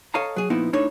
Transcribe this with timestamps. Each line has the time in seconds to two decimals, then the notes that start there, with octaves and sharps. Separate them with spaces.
0.14 A4 C#5 D#5 F5 A5 A#5
0.36 F#3 G#4
0.50 A#2 F3 B3 D#4 E4
0.73 A2 D4 D#4 A4 C#5